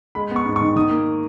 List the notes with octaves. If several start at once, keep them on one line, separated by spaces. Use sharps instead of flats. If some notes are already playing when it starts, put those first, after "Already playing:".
G#3 B5
B3
C#6
G#2
C#6
D#3
D#3 D#6
A#3